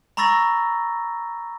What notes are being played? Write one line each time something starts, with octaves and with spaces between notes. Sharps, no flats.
A#5 B5 C#6 E6 A6 A#6